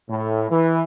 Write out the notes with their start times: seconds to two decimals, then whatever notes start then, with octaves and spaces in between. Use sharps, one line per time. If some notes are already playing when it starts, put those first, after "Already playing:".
0.10 A2
0.51 E3